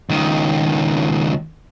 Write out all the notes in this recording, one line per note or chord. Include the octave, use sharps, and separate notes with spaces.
C#2 D#3